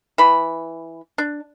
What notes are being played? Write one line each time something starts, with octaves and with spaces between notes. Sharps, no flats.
E3 B5
D4